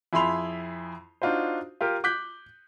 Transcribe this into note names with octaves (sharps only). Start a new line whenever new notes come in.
F2 E4 G#4 B5 C6 F7
D4 D#4 F4 F#4 C5
F4 G4 A#4
D6 F#6 G6 B6